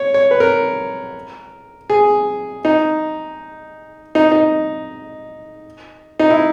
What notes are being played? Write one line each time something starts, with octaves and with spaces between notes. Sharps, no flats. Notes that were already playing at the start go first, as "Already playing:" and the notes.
Already playing: C#5
C#5
B4
A#4
G#4
D#4
D#4
D#4
D#4
E4